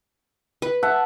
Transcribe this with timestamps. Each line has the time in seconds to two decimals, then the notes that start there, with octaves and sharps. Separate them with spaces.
0.62 B4
0.83 E5 F#5 A5